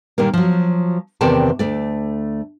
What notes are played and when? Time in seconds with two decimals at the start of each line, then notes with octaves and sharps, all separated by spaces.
0.18 A#2 D#3 G3 A#3
0.34 F3 F#3
1.21 E2 C3 D#3 C5 D5 A5
1.59 D2 A3 D5